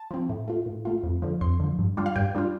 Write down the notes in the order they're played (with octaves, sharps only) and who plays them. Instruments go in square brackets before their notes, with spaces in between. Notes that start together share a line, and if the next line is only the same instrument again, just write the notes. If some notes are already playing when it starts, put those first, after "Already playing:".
Already playing: [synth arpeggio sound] A5
F3 C4
A2
A3 F4
A2
A3 F4
F2
D3 F3
F2 C6
D3 F3
G2
G3 D4 F4
F5
G2 G5
G3 D4 F4